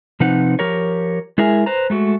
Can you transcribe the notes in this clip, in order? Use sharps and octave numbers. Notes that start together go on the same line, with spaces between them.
C3 F3 C4 D#4 B4 F#5
F3 G4 A#4 C#5
G#3 E4 G#4 A#4 E5 G#5
B4 C5 A#5
G#3 A3 F#4